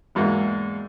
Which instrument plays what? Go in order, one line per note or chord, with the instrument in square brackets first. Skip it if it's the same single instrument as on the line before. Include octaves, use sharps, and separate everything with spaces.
[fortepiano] E2 G#2 F#3 A#3 B3